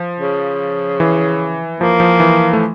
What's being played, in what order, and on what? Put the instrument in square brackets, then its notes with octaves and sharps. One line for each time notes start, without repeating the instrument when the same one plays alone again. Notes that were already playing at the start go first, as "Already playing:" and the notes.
Already playing: [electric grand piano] F3
[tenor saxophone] C#3
[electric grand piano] E3
[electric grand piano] F3 [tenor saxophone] A#3
[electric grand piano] F3
E3
A3